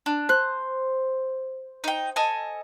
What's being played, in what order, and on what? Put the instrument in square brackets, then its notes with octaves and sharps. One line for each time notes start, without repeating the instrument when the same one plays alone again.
[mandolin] D4
[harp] C5 [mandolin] F#6
[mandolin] D#4 G5
A4 D#5 G#5